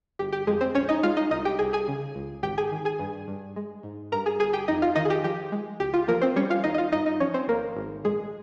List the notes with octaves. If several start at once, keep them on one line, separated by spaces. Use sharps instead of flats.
G1 G4
G4
F2 G#3 G#4
C4 C5
A#1 C#4 C#5
D#4 D#5
G#3 F4 F5
D#4 D#5
C2 D#4 D#5
G4 G5
C2 G#4 G#5
G#4 G#5
C#3
C#2
G#1 G4 G5
G#4 G#5
D#3
G#4 G#5
G2
G2
G#3
G#2
G2 A#4 A#5
G#4 G#5
G1 G#4 G#5
G4 G5
F2 D#4 D#5
F4 F5
D#3 D#4 D#5
G#4
G4
F3 G4
G#3
C#2 G4
F4
F3 A#3 A#4
C4 C5
G3 C#4 C#5
F4 F5
D#2 D#4 D#5
D#5
F4 F5
G2 D#4 D#5
D#4 D#5
F3 C#4 C#5
C4 C5
G#1 A#3 A#4
G#1
A#1 G#3 G#4